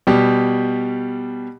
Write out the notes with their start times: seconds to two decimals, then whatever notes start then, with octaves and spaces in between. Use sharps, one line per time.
0.07 B2 G3 G4